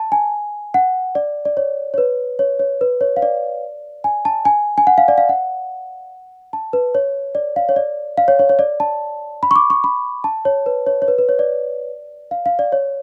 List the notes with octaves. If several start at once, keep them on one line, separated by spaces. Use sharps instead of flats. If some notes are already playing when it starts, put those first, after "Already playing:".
Already playing: A5
G#5
F#5
D5
D5
C#5
C#5
B4
C#5
C#5
B4
C#5
F5
D5
G#5
A5
G#5
G#5
F#5
F5
D5
F5
F#5
A5
B4
C#5
D5
F5
C#5
D5
F5
C#5
C#5
C#5
D5
A5
B5
C#6
D6
C#6
B5
A5
C#5
B4
C#5
C#5
B4
B4
C#5
D5
F5
F5
D5
C#5